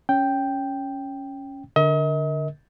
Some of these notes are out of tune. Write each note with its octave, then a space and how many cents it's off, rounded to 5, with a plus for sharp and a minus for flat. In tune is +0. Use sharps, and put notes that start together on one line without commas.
C#4 +0 G5 +0
D3 +0 A#4 +0 D#5 +40